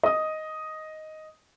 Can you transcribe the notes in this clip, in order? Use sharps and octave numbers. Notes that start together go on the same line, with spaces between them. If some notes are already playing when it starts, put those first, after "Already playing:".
D#5 D#6